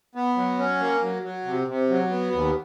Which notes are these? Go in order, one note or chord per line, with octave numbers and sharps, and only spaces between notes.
B3
F#3
C#4
A#3
F#3
F#3
C3
C3
F#3
B3
D#2